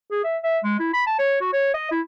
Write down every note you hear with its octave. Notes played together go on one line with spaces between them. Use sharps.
G#4
E5
E5
G#3
E4
B5
A5
C#5
F#4
C#5
D#5
E4